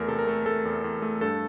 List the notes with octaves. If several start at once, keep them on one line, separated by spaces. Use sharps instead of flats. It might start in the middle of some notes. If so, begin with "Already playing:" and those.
Already playing: E2 A3 A#4
C3 A4
A#4
A3 A4
A3 A4
E2
E2
A3
G2 A4